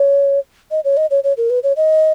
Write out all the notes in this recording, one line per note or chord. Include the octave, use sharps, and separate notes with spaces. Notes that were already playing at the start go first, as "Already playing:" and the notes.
Already playing: C#5
D#5
C#5
D#5
C#5
C#5
A#4
B4
C#5
D#5